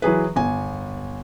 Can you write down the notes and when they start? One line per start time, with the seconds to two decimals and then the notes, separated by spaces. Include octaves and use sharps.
0.02 E3 F#3 G#4 B4
0.36 G1 G#5